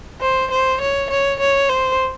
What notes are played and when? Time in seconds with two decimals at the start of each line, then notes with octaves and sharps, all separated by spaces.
0.21 C5
0.51 C5
0.81 C#5
1.10 C#5
1.40 C#5
1.69 C5